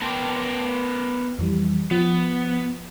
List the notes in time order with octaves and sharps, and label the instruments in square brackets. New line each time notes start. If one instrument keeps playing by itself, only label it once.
[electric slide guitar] B3 A#4 G5 [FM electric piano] A5 C6 D6
[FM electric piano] F2 E3 G3
[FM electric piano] F3 [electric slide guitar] B3